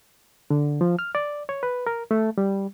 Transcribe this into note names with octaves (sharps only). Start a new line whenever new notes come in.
D3
F3
F6
D5
C#5
B4
A#4
A3
G3